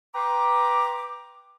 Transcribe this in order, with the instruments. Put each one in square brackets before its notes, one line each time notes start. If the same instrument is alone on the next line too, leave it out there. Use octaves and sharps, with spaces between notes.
[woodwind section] B4 G5 A#5 C6 D6